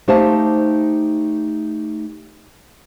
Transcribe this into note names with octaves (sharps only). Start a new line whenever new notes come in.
A3 D#4 G4 C5 F5 A5